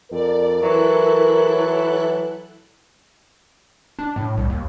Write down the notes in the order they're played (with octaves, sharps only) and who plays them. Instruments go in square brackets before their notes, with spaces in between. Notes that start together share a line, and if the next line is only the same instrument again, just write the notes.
[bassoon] F2 [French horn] A#4 [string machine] D5
[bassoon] E3 [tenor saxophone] F#3 [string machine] E4 A4 F#6
[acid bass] D4
A2
C2
D#2